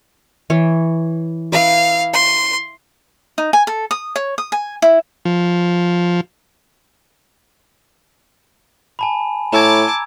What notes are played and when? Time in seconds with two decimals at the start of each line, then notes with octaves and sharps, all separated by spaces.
0.50 E3 C#5
1.52 E4 B4 F5 D6
2.13 C6
3.38 D#4
3.53 G#5
3.67 A4
3.91 D#6
4.16 C#5
4.38 D#6
4.52 G#5
4.82 E4
5.25 F3
8.99 G#5 A5 B5
9.52 A2 A5 A#5 D6 E6 G#6